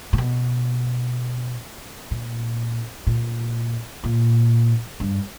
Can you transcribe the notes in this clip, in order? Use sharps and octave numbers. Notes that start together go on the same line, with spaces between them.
A#2
B2
A#2
A#2
A#2
G2